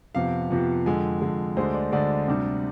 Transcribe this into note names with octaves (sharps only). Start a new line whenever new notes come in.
F2 C3 F3 B3 F5
F2 C3 F3 B3
F2 D3 G#3 G#5
F2 D3 G#3
D2 D3 G#3 C5
D5
D2 D3 G#3 D5
D2 C3 G3 D4